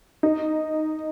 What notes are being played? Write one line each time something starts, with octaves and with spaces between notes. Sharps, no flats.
D#4